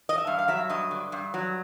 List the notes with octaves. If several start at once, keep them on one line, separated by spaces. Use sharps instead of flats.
D#5
E5
G2 F5
F5
F#3 E5
G2 D#5
D3
G2
F#3